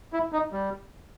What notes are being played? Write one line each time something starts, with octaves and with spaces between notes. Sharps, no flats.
E4
D#4
G3